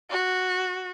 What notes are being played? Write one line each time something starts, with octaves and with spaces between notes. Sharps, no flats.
F#4